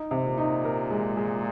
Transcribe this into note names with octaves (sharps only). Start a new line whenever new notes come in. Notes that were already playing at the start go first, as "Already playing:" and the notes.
Already playing: D#4
C3
A#2
D#4
A#4
G#3
G#3